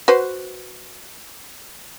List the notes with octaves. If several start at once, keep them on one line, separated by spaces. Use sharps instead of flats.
F#4 B4 C5